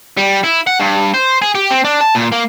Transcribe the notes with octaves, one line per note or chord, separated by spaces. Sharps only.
G3
E4
F#5
G2
C5
G#4
G4
C4
D4
A5
A#2
A#3